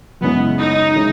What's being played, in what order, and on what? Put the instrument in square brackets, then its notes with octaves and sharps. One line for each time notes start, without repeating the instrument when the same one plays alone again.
[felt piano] F#2 C#3 G#3 C#4 E4 [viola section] B3
[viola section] D#4
[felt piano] C#3 G#3 C#4 E4